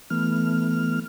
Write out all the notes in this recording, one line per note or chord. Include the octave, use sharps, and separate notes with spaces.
E3 A3 B3 F6